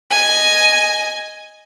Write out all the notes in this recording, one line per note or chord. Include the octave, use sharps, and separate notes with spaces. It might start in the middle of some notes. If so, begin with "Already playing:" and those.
D#5 G#5